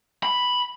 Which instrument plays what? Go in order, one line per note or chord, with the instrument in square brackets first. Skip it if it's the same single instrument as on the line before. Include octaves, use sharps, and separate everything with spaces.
[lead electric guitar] B5